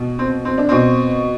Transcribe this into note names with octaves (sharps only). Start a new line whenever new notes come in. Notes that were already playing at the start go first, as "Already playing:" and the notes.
Already playing: B2
C4
C4
D4
B2 C4